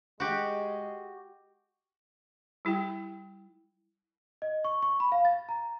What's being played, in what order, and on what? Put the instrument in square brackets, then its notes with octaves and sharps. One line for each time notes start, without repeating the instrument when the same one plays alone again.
[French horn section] G#3 D#5 [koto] F#4 G4
[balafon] G3 E4 G4 G5
[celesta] D#5
C#6
C#6
B5
F5
A6
A#5